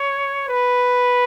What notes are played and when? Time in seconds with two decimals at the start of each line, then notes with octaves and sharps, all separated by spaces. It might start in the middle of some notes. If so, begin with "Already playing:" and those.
Already playing: C#5
0.48 B4